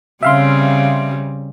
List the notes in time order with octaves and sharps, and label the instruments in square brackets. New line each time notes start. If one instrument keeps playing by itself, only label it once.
[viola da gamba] C#3 G3 C4 [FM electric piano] E5 F5 C6